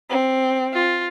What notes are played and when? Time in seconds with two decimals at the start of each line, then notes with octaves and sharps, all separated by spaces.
0.10 C4
0.73 F4